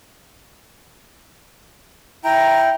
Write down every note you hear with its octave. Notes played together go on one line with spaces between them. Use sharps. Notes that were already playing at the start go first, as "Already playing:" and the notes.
E4 G5 A#5